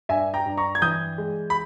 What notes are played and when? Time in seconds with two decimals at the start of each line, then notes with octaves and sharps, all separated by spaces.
0.09 G2 E5 G#5
0.34 G5 A#5
0.46 G2
0.57 A#5 C#6
0.75 G#6
0.82 E3 D#6 G6
1.18 G#3
1.50 B5